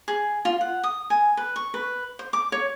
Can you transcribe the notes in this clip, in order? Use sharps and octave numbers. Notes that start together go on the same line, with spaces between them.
G#4
F4
F#5
D#6
G#5
B4
C#6
B4
C5
D6
C#5